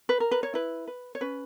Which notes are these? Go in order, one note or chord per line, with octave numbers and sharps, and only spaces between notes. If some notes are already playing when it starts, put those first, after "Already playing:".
B4
A#4
B4
C#5
E4 B4
B4
C#5
C#4 B4